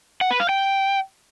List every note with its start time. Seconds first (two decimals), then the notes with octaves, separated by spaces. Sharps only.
0.21 F#5
0.31 B4
0.40 F5
0.49 G5